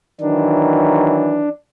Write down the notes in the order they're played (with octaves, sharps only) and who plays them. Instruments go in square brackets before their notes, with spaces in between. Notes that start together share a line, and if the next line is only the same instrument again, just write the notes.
[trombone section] D#3 E3 F#3 [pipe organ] D4